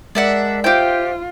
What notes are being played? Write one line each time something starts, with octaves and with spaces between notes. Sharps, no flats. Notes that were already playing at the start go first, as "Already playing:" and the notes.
G#3 D4 A#4 D5 E5 F#5
F4 G4 C5 E5 G5